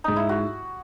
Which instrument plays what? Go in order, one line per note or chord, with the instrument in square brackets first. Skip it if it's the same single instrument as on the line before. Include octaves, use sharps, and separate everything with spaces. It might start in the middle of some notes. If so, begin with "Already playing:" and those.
[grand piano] G#2 [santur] D#4
[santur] E4
F#4